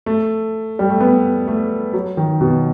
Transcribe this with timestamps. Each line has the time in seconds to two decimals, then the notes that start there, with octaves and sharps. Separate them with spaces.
0.06 A3
0.79 G3
0.90 A3
1.00 B3
1.47 A3
1.93 F#3
2.17 D#3
2.41 B2